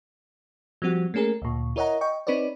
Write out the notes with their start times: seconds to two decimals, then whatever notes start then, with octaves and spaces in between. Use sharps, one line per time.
0.82 F3 G3 C4 F#4
1.14 A3 A#3 C#4 G#4 A#4
1.42 D2 A#2
1.76 E4 A#4 C#5 D#5 F#5 A#5
2.01 D#5 G5 C#6
2.27 C4 D#4 B4 C#5 D5